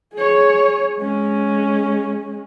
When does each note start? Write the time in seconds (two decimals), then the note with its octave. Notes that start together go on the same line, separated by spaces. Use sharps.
0.14 G#4 C#5
0.98 G#3 C#4